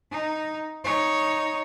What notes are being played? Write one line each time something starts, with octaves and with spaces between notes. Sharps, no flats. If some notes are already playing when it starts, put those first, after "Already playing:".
D#4
D#4 C#5